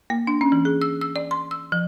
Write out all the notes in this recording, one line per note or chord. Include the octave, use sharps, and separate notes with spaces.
A#3
D4
C#4
E3
G#4
E6
E6
D5
C6
E6
F3